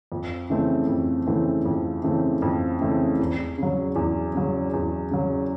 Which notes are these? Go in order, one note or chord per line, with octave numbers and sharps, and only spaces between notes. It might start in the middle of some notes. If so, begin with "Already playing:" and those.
F2
C#3 E3 A3 C4
F2
C#3 E3 A3 C4
F2
C#3 E3 A3 C4
F2
C#3 E3 A3 C4
E2
C#3
F#3
E2
C#3 F#3
E2
C#3 F#3